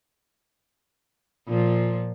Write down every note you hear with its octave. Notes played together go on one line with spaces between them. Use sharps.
A#2 F3